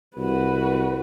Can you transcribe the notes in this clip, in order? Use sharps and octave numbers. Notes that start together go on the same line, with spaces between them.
C2 F#4 B4